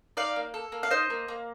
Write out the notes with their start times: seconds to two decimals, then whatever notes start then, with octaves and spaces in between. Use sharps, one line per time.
0.17 D#4 D5 F5
0.36 A#3
0.54 A4
0.72 A#3
0.83 F5
0.90 D#4 C5 D#5
1.10 A#3
1.28 A#3